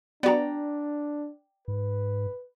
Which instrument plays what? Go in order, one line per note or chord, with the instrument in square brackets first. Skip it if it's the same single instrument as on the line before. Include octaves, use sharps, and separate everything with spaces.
[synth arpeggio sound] B3 F#4 [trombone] D4 [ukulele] D5 G5 A#5
[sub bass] G#2 [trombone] B4